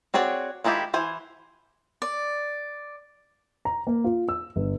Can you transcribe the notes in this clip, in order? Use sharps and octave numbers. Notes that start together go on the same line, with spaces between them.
C4 F#4 G#4 C#5 D5
D#3 G#3 E4 F4 G4
E3 C5 G#5
D5
A#5
A#3
F4
E6
G1